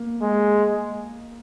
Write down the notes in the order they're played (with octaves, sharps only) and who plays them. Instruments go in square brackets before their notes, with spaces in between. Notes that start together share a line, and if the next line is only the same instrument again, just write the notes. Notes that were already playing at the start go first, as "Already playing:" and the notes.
Already playing: [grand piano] A#3
[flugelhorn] G#3